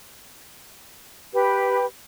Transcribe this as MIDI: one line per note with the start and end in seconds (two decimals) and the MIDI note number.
1.33 1.85 67
1.33 1.85 71